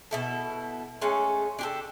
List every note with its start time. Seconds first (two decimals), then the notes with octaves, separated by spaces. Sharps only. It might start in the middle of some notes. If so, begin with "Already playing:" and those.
0.11 B2 E4 A4
1.01 G#3 A3 C#4
1.59 D4 G4 A4